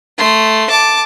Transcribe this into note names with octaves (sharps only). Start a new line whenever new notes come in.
A3 C6
A5 D6